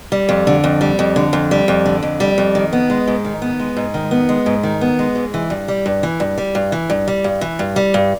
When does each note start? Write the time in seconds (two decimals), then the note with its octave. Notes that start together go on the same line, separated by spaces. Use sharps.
0.12 G3
0.29 F2
0.47 D3
0.64 F2
0.81 G3
0.99 F2
1.16 D3
1.33 F2
1.51 G3
1.68 F2
1.86 D3
2.03 F2
2.20 G3
2.38 F2
2.55 D#3
2.73 B3
2.90 G#3
3.08 G#2
3.25 D#3
3.42 B3
3.60 G#3
3.77 G#2
3.94 D#3
4.11 B3
4.29 G#3
4.46 G#2
4.63 D#3
4.81 B3
4.99 G#3
5.16 G#2
5.34 E3
5.50 G2
5.68 G3
5.86 G2
6.03 E3
6.20 G2
6.38 G3
6.55 G2
6.72 E3
6.90 G2
7.08 G3
7.24 G2
7.41 E3
7.59 G2
7.76 G3
7.94 G2